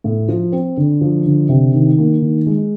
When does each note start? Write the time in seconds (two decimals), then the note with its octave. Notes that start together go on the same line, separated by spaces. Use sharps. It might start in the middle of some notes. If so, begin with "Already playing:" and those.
0.04 A2
0.29 F3
0.52 C4
0.77 D3
1.01 F3
1.26 D3
1.49 C3
1.73 D#3
1.98 A#3
2.22 D#3
2.47 G#3